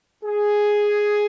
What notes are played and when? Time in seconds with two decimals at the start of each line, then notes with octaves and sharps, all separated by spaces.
0.24 G#4